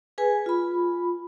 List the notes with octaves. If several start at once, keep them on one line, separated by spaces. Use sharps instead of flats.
G#4 B4 G#5
F4 B5